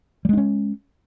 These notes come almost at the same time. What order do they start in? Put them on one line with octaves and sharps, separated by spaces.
G3 G#3 D4 C#4